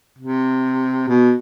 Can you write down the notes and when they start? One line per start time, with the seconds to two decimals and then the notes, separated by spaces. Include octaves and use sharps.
0.19 C3
1.08 B2